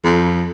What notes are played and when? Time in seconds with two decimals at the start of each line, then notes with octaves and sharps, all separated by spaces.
0.04 F2